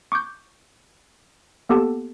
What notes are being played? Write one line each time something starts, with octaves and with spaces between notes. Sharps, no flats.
C#6 D6 F#6 G6
A#3 B3 G4 A4 F#5 A5